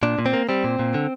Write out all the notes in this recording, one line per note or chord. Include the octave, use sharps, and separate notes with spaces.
A#2 D4
A#2
C4
A#3
G3 C4
A#2
A#2
D3